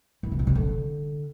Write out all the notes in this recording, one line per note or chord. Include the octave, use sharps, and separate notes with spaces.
E3
C3
B2
C3
D3